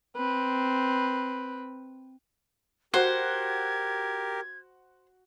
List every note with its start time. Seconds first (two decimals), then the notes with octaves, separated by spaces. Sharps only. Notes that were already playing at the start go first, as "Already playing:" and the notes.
0.17 C4 B4
2.94 F#4 G4 A#4 C5 G#6